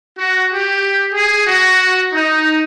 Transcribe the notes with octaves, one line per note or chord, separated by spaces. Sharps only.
F#4
G4
G#4
F#4
D#4